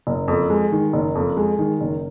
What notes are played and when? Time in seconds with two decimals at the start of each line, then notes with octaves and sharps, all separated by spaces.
0.07 F#1
0.28 F2
0.50 G#3
0.72 D#3
0.93 F#1
1.15 F2
1.37 G#3
1.59 D#3
1.81 F#1